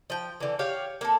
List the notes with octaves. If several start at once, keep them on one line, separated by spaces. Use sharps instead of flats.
F3 G5
D3 E3
G4 C#5 F5 F#5
A#3 A4